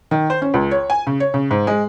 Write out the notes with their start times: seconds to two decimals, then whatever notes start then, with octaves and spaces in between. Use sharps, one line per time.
0.11 D#3
0.30 C5
0.42 C#4
0.54 C#2
0.71 C#5
0.90 G#5
1.07 C#3
1.20 C#5
1.34 C#3
1.51 G#2
1.67 G#3